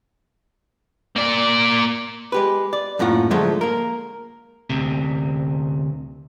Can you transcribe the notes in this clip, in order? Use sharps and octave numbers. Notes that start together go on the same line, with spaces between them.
A#3 D5
G#3 G4 B4
D5
F#2 A2 A#3 F4 F#5
D3 F3 F#3 G#3 A3
A#3 A#4
D2 C3